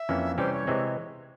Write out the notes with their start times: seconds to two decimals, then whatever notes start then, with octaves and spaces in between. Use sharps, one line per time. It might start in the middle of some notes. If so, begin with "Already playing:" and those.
Already playing: E5
0.09 F2 E3 A#3 C#4
0.38 C3 E3 G3 C#4 G4 C5
0.53 C#5
0.67 C3 E3 G#3 C4